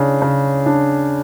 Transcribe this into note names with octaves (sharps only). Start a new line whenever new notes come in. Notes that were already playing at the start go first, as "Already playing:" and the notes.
Already playing: C#3 D4
C#3
D4